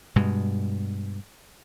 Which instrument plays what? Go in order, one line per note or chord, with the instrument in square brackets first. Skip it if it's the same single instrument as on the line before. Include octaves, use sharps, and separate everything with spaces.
[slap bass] G2 B2 G#3